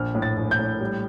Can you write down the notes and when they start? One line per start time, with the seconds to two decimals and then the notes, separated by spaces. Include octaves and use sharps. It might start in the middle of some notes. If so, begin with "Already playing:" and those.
Already playing: A#1 F6
0.15 A2
0.22 A6
0.37 A#1
0.51 G6
0.59 A2
0.80 G3